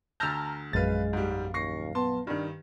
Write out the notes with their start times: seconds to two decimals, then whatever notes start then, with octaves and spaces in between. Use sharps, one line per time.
0.20 D2 A5 A#5 E6 F6 G6
0.73 A#1 F#2 G#3 B4 F5 A6
1.13 G#2 G3
1.54 D#2 C#6 A#6 C7
1.95 B3 A5 C6
2.27 G2 D#3 D4